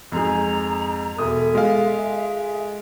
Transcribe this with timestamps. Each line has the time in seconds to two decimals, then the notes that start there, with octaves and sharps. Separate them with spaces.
0.12 F2 G#2 G#4 A#5
1.18 E1 A4 E5 D#6
1.55 G#3 F4 F5